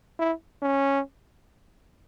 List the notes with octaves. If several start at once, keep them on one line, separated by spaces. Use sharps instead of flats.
E4
C#4